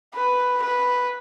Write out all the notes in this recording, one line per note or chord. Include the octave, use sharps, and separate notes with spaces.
B4
B4